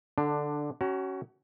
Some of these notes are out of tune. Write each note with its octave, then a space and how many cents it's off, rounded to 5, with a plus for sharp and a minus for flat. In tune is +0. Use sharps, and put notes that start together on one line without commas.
D3 +0 D4 +15
C#4 +0 F#4 +30 A#5 +0